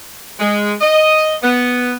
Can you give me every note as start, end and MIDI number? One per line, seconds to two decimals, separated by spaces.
0.39 0.73 56
0.81 1.34 75
1.43 1.95 59